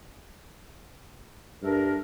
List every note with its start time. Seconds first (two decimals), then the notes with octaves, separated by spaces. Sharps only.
1.62 G2 A3 D4 A#4